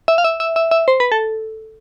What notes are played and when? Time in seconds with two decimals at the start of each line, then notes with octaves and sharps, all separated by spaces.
0.08 E5
0.18 F5
0.24 E5
0.40 E5
0.56 E5
0.71 E5
0.88 C5
1.00 B4
1.12 A4